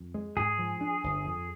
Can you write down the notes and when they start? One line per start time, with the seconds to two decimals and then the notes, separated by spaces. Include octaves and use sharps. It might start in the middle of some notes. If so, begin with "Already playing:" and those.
Already playing: F2
0.14 G#3
0.36 G#2 G#4
0.58 F3
0.81 D4
1.04 G1
1.25 F2